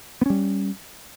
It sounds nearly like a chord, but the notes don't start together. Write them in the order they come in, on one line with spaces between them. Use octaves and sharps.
B3 C#4 G3